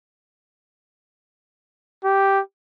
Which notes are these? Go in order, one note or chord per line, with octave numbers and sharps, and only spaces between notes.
G4